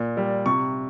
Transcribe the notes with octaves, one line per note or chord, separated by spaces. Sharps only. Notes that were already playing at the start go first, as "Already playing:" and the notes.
Already playing: A#2
G3
C3 C#6